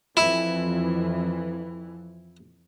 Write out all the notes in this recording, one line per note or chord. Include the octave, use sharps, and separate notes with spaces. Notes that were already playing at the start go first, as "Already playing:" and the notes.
F2 E3 E4